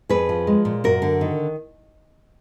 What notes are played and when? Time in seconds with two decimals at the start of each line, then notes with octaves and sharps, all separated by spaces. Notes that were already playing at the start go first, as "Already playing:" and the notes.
0.09 F2 G#4 B4
0.29 F3
0.47 G#3
0.65 A#2
0.84 F#2 F#4 A#4
1.02 D3
1.21 D#3